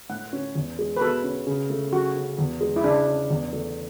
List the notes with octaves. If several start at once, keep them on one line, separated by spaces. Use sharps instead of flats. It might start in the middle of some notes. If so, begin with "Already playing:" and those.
A2 F#5
C#4
E2
G#3
B4
B2 A4
C#4
C#3
A3
C#3 F#4
C#4
E2
G#3
E4
C#3 D4
C#4
E2
A3